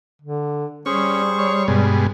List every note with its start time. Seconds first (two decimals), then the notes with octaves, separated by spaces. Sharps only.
0.22 D3
0.86 G3 C#4 G#4 C5 C#6
1.39 C#5
1.68 G2 B2 G#3